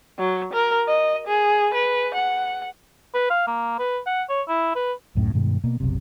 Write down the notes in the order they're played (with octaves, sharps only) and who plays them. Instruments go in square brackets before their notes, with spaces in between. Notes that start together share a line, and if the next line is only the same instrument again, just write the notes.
[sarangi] F#3
A#4
D#5
G#4
B4
F#5
[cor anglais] B4
F5
A#3
B4
F#5
C#5
E4
B4
[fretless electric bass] C#2 F#2 A2 C#3
G2 B2 D#3 G#3
B2 A#3
F#1 B1 C3